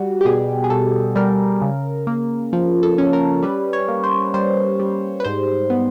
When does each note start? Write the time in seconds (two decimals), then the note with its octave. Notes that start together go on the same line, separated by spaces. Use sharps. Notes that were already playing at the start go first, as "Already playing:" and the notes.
Already playing: G3 F#4
0.21 G4
0.25 B2 G#4
0.64 G#4
0.70 B2 A4
1.16 G3 A#4
1.62 C#3
2.07 A#3
2.53 F3
2.83 A4
2.98 C#4
3.13 A#4
3.43 G3 B4
3.73 C#5
3.88 A#3
4.04 C5
4.34 G3 C5
4.79 G3
5.20 B4
5.24 G#2 C5
5.70 B3